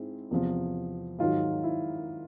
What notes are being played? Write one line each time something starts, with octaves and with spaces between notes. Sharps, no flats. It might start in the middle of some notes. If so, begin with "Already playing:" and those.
Already playing: G#2 G#3 C4 E4
E2 C3 F3
G#2 D#3 F#3 F4
E4